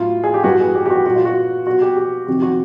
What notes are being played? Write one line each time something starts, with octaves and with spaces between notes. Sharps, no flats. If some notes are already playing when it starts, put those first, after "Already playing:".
Already playing: A2 F#3 F4
G#4
G4
G2 E3 G3 F#4
G#4
G4
G4
F#4
A#2 F#3 F#4
F4
F#4
B2 F#3 F#4
G4
G4
F2 C3 D#3 F#3 G4
F#4